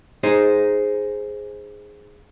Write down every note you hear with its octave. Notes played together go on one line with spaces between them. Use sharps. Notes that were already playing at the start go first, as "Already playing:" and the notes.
D#4 G#4 C5